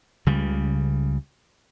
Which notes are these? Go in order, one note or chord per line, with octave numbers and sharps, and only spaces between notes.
C#2 C#3 G3